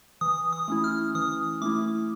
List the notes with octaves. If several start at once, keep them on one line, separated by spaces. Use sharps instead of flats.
E3 D#6
D#6
A3 C#4 E4
F6
E3 D#6
A3 C#4 E4 D6